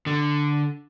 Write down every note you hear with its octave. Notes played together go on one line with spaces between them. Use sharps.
D3